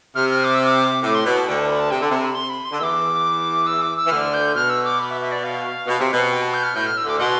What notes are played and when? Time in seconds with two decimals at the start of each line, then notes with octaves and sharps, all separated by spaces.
0.15 C3 F6
0.30 F6
0.44 D6
0.55 E6
0.65 D6
1.03 A2 D6
1.15 C6
1.25 B2 B5
1.37 A5
1.47 D2 D3 G5
1.58 A5
1.69 B5
1.80 A5
1.91 C3 G5
2.01 D3 A5
2.11 C3
2.21 B5
2.35 C6
2.50 B5
2.65 C6
2.72 D3
2.79 E2 E3 D6 E6
3.67 E6
3.82 D6
3.97 E6
4.06 E3
4.11 D2 D3 F6
4.34 G6
4.55 B2 F6
4.70 E6
4.85 D6
5.00 B5
5.10 E5
5.21 E5
5.32 D5
5.43 F5
5.87 B2
6.00 C3
6.13 B2
6.31 G5
6.42 A5
6.54 G6
6.64 F6
6.75 A2 G6
6.86 F6
6.97 E6
7.05 D2 D3 D6
7.19 B2 C6